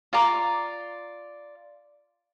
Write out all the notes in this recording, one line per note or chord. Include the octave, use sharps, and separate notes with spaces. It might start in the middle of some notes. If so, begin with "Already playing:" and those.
F4 D5 A#5 D6